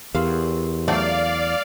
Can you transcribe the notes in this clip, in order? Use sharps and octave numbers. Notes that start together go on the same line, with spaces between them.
E2 G4 A#4 F5 C6
F#3 A3 C4 D5 F5